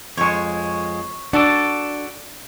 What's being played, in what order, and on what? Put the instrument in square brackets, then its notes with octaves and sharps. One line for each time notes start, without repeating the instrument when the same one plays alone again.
[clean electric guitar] F2 G#3 [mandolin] C#5 C#6
[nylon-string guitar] D4 [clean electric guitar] F#4 A4 D5